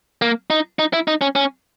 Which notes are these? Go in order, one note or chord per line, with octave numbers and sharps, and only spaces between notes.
A#3
D#4
D#4
E4
D#4
C#4
C#4